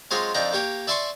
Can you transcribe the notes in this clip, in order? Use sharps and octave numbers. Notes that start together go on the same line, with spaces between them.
F#3 G#3 C4 F4 C#5 D#5
F2 F3 D4 D#4 G5 A#5
A#3 G4 C#5 G5
D5 E5 G#5 A5 C6 C#6